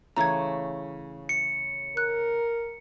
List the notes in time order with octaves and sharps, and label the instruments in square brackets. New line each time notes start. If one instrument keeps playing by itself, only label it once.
[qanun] C#3 E3 A3 [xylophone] A#5 G#6
[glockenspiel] C#7
[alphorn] A#4 [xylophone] F#6